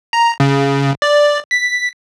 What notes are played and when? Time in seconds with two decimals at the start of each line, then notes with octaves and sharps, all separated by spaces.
0.13 A#5
0.40 C#3
1.02 D5
1.51 B6